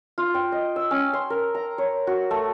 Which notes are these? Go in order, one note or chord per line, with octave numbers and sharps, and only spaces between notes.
F4
G5
D#5
E6
C#4
C6
A#4
A#5
C#5
F#4
A3